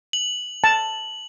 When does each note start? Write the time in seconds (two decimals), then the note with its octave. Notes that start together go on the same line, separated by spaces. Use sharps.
0.13 F#7
0.64 A5